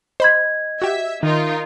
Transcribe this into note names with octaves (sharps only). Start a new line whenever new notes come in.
C5 D#5 B5 G#6
F#4 G4 E5
D#3 D#4 F4 A#4